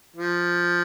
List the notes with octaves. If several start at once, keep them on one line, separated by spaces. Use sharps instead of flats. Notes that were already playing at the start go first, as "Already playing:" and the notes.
F3